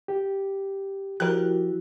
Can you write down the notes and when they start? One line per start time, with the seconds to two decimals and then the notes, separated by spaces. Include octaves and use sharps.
0.08 G4
1.20 F3 E4 F#4 G4 A#4 F#6